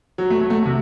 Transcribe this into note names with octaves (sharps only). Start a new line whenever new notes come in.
F#3
A3
F#3
A3
C3